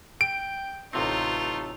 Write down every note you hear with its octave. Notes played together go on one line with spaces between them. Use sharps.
G5 D7
A1 C3 A3 C4 D#4 F4